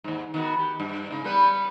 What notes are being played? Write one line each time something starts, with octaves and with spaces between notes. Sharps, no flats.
D#2 G#2
D#3 B3 F#4
G4
G2
G#2 C#3
G3 B3 B4